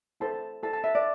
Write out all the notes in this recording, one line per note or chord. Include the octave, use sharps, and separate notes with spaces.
E4 A4 C5 A5
E4 A4 C5 A5
A5
E5
D5